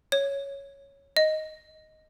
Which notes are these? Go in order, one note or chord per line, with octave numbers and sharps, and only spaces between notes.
C#5
D#5